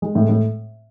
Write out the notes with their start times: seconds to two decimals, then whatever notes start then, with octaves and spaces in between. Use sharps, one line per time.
0.02 G#3
0.15 A2
0.29 A2